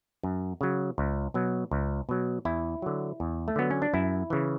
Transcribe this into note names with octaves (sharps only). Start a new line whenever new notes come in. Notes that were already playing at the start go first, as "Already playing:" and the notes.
F#2
C#3 F#3
C#2
B2 F#3
C#2
B2 F#3
E2 E4
D3 F#3
E2
A3
D3 F#3 B3
C#4
D4
F#2 E4
C#3 E3